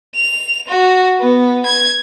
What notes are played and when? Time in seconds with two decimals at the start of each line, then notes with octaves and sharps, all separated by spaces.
0.15 F7
0.68 F#4
1.20 B3
1.66 G#6